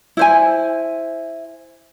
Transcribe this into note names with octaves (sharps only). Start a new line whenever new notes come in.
E4 C5 G#5